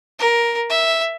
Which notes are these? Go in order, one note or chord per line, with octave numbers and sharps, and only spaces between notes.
A#4
E5